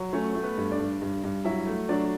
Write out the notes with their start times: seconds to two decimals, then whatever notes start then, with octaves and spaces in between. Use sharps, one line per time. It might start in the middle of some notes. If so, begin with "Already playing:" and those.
Already playing: F#3
0.13 A3 C#4 C#5
0.35 A3
0.42 B3 B4
0.57 G2
0.72 D4 D5
0.79 G2
1.02 G2
1.24 G2
1.45 F#3 E4 E5
1.66 A3
1.89 F#3 D4 D5